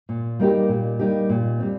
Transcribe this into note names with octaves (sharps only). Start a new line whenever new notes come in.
A#2
G3 A#3 D#4 G4
A#2
G3 A#3 D#4 G4
A#2
G3 C4